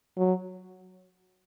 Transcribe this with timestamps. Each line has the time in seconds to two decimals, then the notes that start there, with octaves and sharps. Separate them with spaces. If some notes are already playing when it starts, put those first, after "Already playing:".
0.18 F#3